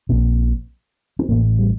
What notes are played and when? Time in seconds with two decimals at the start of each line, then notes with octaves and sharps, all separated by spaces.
0.09 A#1 A#2 C4
1.19 C4
1.29 A1 A2 A#3
1.59 G3